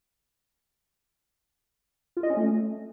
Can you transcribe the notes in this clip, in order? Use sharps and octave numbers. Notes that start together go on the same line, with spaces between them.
F4
D#5
C#4
A3